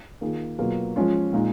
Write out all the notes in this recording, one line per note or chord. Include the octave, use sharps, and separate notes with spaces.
D#3 A#3 F4 G#4
B2 F#3 A#3 F4 G#4
F3 G#3 C#4 F4
A#2 G#3 D#4